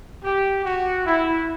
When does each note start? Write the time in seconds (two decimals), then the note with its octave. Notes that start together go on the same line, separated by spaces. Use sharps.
0.24 G4
0.65 F#4
1.05 E4